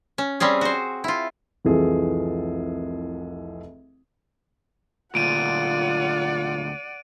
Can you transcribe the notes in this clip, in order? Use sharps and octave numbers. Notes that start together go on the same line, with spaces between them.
C#4
G3 C4 C#4 G#4
F#4 C5
E4 F4
F1 C2 E3 F4 G#4 A4
D2 A#2 F4 D5 F#5 D7 D#7